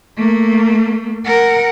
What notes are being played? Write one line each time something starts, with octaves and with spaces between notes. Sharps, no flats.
A3 A#3
A#4 F#5